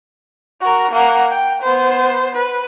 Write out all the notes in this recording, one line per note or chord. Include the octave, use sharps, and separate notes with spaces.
F#4 A#4
A#3 F#5
G5
B3 C5
B4